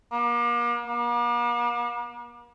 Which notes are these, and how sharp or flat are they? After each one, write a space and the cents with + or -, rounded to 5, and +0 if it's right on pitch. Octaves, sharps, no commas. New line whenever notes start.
A#3 +40
A#3 +45